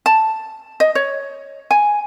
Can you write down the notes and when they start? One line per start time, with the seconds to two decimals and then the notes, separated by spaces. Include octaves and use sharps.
0.06 A5
0.80 D#5
0.95 C#5
1.71 G#5